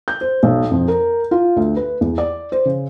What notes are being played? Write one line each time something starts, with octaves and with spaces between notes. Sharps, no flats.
G6
C5
B1
F2
A#4
F4
D2
B4
E2
D5
C5
C#3